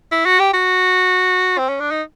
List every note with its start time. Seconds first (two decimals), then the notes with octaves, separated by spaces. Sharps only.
0.12 E4
0.26 F#4
0.40 G4
0.54 F#4
1.58 C4
1.69 C#4
1.80 D4
1.91 D#4